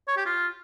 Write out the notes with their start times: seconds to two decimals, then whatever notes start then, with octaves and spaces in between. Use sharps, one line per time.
0.08 C#5
0.17 G4
0.26 F4